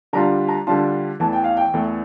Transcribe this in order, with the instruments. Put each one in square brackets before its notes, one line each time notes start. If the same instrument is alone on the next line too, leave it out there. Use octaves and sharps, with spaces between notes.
[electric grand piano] D3 G3 D4 F4 [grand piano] A#5
[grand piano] A#5
[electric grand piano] D3 G3 D4 F4 [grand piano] A5
[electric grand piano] E2 E3 A3 [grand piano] A5
[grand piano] G5
F5
G5
[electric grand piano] E2 E3 A3